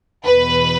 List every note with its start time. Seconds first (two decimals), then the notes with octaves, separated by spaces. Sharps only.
0.25 E2 B2 B4